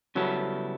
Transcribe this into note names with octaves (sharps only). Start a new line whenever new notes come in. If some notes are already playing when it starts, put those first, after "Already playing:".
C#3 F#3 G3 B3 E4 A4